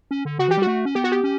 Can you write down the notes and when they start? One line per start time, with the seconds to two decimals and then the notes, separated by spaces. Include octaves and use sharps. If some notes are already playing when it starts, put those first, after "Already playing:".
0.11 C#4
0.25 D3
0.39 C#3 F#4
0.48 E3 G4
0.57 G3
0.62 A3 F#4
0.85 C#4
0.95 B3 G4
1.04 F#4
1.12 G4
1.24 C#4